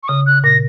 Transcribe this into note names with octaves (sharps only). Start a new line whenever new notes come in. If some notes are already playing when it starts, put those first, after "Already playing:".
C#6
C#3 D#6
F#6
A#2 A#6